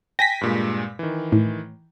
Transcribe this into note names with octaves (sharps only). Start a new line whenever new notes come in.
G5 G#5 A#6 B6
G2 A#2 G#3
D#3 E3
A2